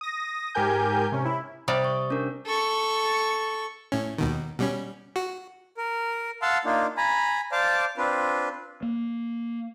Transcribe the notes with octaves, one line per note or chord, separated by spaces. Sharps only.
D#6 A#6
G#2 G4 A#4 G#5 G6
C3 C#4
E4
C3 G3 D5 D#6
C#6
C#4 D4 A#4
A4 C#6
A2 C#4
D#2 B2 D#3
B2 G3 C#4
F#4
A#4
F5 F#5 A5 C6 E6
A#3 D4 D#4 F4
G#5 A#5 B5
C5 D5 F5 A5 D6
C4 D4 F4 B4
A#3